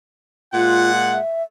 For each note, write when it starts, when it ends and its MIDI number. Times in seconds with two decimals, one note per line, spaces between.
0.54 1.20 46
0.54 1.20 56
0.54 0.90 65
0.54 1.20 78
1.13 1.43 76